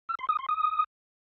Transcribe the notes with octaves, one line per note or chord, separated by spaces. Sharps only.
E6
C6
D#6
C6
D#6